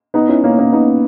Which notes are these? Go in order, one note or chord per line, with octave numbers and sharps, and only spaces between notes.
B3 D#4
C#4 E4
A#3 C#4
A#3 C#4
B3 D#4